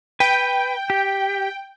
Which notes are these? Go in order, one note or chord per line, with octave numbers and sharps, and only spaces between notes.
B4 G5
G4